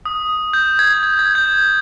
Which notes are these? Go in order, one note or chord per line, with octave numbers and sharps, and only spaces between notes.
D#6
G6
G#6
G#6
G#6
G6